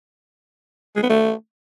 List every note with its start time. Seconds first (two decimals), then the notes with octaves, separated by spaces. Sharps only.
0.96 G#3
1.03 B3
1.10 A3